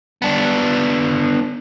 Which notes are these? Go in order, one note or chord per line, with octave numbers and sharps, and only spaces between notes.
B3 D4